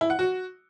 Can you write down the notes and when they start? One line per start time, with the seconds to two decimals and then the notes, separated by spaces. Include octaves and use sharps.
0.01 E4
0.10 F#5
0.19 F#4